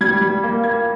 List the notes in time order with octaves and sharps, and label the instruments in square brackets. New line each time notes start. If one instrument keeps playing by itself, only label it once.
[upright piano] G3 G#6
G3 G#6
A#3
A#3 G#6